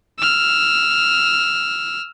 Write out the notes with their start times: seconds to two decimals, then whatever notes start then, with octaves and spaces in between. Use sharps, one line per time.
0.19 E6 F6